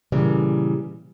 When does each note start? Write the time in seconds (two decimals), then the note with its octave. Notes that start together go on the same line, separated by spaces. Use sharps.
0.12 A#2 C#3 E3 G3